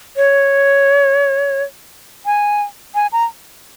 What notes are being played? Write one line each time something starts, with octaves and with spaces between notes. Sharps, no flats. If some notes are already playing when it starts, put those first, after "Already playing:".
C#5
G#5
G#5
A#5